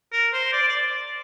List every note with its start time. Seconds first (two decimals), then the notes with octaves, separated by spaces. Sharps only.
0.13 A#4
0.33 C5
0.53 D5
0.69 D5